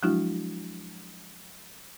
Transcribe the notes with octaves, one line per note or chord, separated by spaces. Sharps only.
F3 F#3 G#3 D4 E4 F#4